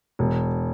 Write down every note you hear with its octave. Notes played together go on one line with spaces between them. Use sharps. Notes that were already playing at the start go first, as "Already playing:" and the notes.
E1